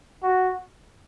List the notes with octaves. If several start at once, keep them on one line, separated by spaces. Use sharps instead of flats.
F#4